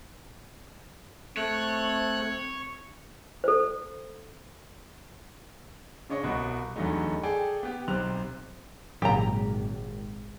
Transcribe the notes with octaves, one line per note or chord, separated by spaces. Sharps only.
A3 C4 C#5 F#6
A4 C5
C#3 D4 C#5 D#5 C#6
C2 B2 F#4
E2 D3 F#3 G3 A3 D#4
G#4 A4 D5 G5 G#5
B3 G4
B1 C3 C5 F#6 F7
G#1 A#2 C#3 F#3 G4 A#5